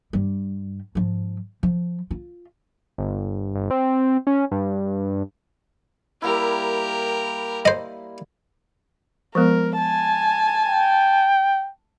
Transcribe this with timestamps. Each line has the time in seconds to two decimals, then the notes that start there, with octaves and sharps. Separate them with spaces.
0.13 G2 G3
0.95 G#2 F3
1.63 F3
2.11 F4
2.98 G1
3.55 G1
3.71 C4
4.27 C#4
4.51 G2
6.22 G3 A#3 E4 G4 A#4
7.65 C5 D#5
9.35 F3 G#3 B3 A#4
9.78 G#5 A5
10.67 G5